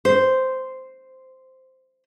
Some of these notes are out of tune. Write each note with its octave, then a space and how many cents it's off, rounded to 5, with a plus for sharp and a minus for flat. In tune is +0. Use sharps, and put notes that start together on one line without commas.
C5 -5